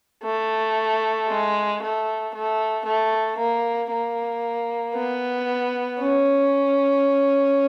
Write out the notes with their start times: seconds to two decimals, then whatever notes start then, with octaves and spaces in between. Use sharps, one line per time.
0.24 A3
1.28 G#3
1.82 A3
2.34 A3
2.85 A3
3.38 A#3
3.91 A#3
4.95 B3
5.99 C#4